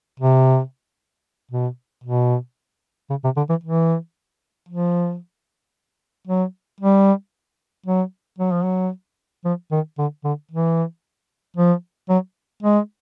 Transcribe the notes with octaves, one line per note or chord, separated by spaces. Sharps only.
C3
B2
B2
C#3
C3
D3
E3
E3
F3
F#3
G3
F#3
F#3
F3
F#3
F3
D#3
D3
D3
E3
F3
F#3
G#3